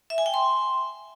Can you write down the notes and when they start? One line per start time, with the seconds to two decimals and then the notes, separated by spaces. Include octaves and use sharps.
0.10 E5
0.18 G#5
0.26 G5
0.34 C6